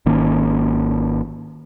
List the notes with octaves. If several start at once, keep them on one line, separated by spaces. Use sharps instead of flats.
G#1 D#3 A#3 C#4